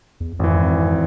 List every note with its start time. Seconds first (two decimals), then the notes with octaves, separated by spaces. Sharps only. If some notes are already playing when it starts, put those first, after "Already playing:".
0.20 E2
0.39 G#1 F2 E3